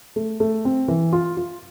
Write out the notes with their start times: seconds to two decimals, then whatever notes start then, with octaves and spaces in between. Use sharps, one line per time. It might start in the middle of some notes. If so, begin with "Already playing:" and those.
0.16 A3
0.40 A3
0.65 C4
0.88 E3
1.13 F4
1.37 F4